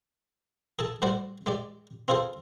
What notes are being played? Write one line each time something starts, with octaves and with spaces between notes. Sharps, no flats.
G#4 A4 A5
A2 G3 F#4 C5 D5
G#3 G4 D5
C4 F4 G#4 A4 C5